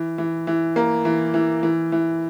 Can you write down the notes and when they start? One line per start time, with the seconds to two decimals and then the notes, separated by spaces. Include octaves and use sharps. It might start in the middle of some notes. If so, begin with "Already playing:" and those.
Already playing: E3
0.18 E3
0.47 E3
0.76 A#3
1.05 E3
1.34 E3
1.63 E3
1.92 E3